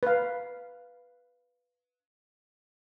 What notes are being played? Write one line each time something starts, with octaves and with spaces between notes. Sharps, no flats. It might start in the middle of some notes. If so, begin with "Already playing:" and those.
B4 F5